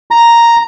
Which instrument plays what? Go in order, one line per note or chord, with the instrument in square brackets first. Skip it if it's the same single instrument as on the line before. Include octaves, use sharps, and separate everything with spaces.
[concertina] A#5